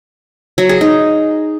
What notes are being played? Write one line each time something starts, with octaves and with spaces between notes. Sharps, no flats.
F#3
G#4
D#4